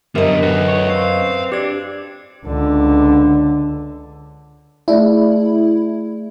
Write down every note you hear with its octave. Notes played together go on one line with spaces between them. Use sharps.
F#2 D3 B3 G4 A#4 D#5 E5
F#4 A4 B4
C#5
C4 F5
D4 G4 G#6
C#2 D3
A3 E4 G#4 D5